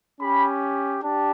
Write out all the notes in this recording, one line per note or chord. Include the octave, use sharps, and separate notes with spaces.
C#4 G4 B5
D4 G4 A5